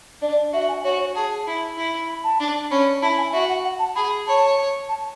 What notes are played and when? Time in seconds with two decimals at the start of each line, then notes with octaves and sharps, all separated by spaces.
0.21 D4 D5
0.53 F#4 E5
0.69 G#5
0.84 F#4 C#5
0.99 C#5
1.15 G#4 A5
1.47 E4
1.77 E4
2.08 B5
2.24 A5
2.40 D4
2.71 C#4 B5
3.02 E4 A5
3.18 G#5
3.33 F#4 E5
3.48 F#5
3.64 F#5
3.79 A5
3.96 G#4 B5
4.27 C#5 A5
4.89 A5